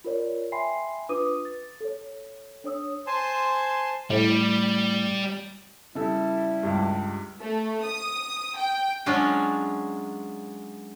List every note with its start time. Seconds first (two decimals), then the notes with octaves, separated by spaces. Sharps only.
0.04 F4 A#4 C#5 D5
0.52 E5 G5 G#5 B5 C6 C7
1.09 D4 F4 B4 D6 D#6 D#7
1.45 A6
1.81 A4 C#5
2.64 D4 C#5 D#6 E6
3.07 C5 G#5 A5 C6
4.10 A2 G3
5.95 C#3 G3 E4 A4
6.63 C#2 G2
7.40 A3
7.83 D#6
8.57 G5
9.06 F#3 G#3 C#4 D4 F4